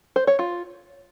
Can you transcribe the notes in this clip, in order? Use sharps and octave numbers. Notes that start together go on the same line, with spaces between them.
C5
C#5
F4